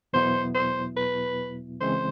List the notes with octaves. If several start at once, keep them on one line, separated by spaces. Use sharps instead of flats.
E2 B2 F#3 B3 E4 C5
C5
B4
C#2 C#3 E3 G#3 C4 C5